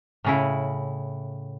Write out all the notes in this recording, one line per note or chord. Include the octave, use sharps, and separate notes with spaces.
A2 C#3 E4